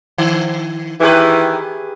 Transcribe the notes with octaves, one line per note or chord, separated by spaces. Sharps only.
D#3
D#3 E3 G4 G#4 B4